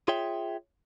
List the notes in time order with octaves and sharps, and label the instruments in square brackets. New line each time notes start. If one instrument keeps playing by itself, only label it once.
[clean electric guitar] F4 G#4 C#5 E5 G5